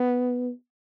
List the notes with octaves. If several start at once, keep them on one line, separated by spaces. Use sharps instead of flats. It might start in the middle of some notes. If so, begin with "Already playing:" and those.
Already playing: B3